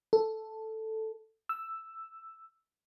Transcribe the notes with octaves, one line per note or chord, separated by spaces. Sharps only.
A4
E6